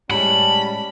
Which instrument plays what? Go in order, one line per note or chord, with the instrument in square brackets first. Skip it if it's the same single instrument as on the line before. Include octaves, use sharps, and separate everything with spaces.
[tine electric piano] A2 G#3 [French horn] G3 [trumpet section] C#4 A5 [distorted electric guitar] B5